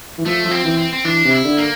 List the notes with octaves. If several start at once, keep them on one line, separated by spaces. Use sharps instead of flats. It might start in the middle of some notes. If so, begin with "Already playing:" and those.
E3
F3 A3
F3
C4
E3
C4
C4
E3 D4
C3
E4
D3
A#3